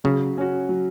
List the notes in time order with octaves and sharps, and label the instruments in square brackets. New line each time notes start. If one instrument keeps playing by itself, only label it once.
[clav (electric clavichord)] C#3 [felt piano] F#3
[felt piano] C#4 F#4
F#3